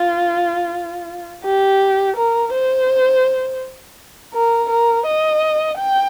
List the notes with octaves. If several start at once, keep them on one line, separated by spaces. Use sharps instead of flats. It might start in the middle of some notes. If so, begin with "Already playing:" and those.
Already playing: F4
G4
A#4
C5
A#4
A#4
D#5
G5